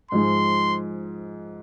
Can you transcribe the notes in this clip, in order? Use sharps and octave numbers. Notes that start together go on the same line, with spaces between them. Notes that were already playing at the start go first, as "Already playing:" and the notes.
G#2 F3 G#3 C6